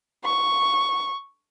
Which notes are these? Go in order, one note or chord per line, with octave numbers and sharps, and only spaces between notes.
C#6